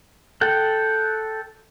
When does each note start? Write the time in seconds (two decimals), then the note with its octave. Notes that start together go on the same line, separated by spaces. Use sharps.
0.41 A4 F#5 G5